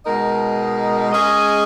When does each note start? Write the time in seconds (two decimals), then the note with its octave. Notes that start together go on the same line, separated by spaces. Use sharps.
0.06 B2 G#3 D#4 A#4 D#5
1.12 G#3 C#4 G#4 D#5